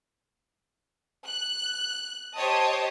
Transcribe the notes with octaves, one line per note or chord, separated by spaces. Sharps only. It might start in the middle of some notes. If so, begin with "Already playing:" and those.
F#6
G4 C5 C#5 D#5 A5 D#6